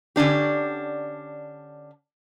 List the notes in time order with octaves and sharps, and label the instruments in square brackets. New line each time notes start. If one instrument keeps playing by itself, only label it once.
[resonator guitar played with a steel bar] D3 C#4 D4 G4